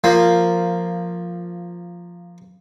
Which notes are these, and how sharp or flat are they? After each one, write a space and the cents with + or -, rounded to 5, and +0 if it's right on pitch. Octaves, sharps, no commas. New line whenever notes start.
F3 +0 A#3 -10